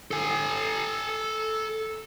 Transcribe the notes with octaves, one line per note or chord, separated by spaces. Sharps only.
A4 G#5